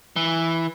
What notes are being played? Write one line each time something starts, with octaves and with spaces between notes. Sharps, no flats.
E3